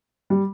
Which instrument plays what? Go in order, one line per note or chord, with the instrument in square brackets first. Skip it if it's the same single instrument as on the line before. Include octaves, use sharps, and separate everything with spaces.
[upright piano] G3